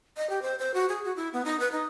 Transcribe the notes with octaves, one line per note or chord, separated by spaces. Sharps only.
D#5
G4
C5
C5
F#4
G#4
F#4
E4
B3
D#4
B4
D#4